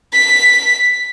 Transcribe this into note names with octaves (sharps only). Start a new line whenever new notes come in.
B6